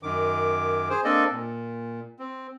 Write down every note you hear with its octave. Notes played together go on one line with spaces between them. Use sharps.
F#2 D#3 D6
G#4 C5
A#3 C4 D4 A4 D5 D#5
A#2
C4